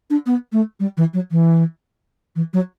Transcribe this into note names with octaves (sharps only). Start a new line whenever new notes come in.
D4
B3
A3
G3
E3
F#3
E3
E3
F#3